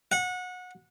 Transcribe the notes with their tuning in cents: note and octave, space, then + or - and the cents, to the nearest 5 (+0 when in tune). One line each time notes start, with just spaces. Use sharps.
F#5 -25